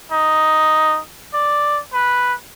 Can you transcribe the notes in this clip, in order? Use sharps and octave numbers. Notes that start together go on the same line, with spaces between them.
D#4
D5
B4